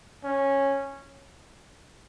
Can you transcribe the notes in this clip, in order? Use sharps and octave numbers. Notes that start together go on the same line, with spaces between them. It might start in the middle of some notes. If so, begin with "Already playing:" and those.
C#4